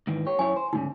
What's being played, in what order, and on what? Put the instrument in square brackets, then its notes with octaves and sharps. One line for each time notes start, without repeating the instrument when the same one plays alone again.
[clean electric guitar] G#2 D#3 E3
G4 C#5
[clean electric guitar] F#2 E4 C#5 [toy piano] G#5
[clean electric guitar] C5
[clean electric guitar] D2 G#2 C#3 [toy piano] D#4